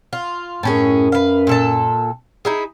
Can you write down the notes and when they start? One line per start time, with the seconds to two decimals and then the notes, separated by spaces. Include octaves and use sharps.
0.13 F4
0.63 F#2 A2 C#4 G#4
1.12 B4 F5
1.47 A#2 A4 A5
2.45 D#4 E4 G#4